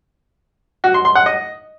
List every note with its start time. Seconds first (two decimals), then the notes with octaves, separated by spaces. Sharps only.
0.84 F#4
0.94 C6
1.05 C6
1.15 F#5
1.26 D#5